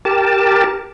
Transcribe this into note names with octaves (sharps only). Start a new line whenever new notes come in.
G4 A#4 A5